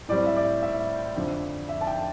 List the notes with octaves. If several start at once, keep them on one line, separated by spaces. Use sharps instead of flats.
A2 G3 C4 D5
E5
D5
E5
F2 D3 F3
E5
A5
G5